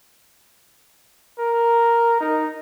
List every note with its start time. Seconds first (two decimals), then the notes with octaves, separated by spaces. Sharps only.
1.39 A#4
2.20 D#4